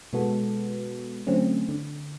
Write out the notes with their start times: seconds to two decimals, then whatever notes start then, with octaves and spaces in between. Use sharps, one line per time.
0.13 B2 G#3 B3 F#4 A4
1.27 D3 F#3 A3 C4 C#4
1.69 D3